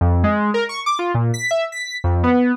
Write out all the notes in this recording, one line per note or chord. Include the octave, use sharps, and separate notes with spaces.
F2
G#3
A#4
C#6
D6
F4
A#2
B6
E5
B6
F2
B3